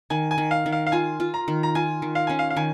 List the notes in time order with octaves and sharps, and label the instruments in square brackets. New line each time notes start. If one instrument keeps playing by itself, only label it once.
[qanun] D#3 [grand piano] G#5
[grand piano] G#5
[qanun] D#3
[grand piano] F5
[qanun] D#3
[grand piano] F5
F5
[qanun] F4 [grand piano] G#5
[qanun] F4
[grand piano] A#5
[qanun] D#3
[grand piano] A#5
[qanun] F4 [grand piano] G#5
[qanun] D#3
[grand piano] F5
[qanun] C#4 [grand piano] G#5
[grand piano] F5
F5
[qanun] D#3 [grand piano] G#5